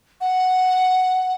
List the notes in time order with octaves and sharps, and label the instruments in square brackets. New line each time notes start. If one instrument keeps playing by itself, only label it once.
[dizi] F#5